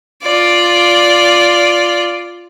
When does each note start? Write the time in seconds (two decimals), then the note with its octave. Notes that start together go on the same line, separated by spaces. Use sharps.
0.23 F4 D5